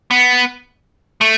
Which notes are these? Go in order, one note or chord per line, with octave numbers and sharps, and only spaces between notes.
B3
A3